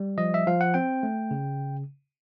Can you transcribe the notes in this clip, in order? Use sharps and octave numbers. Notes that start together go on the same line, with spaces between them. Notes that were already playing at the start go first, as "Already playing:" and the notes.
Already playing: G3
F3 D#5
E5
F3 F5
F#5
C4 G5
A3
C#3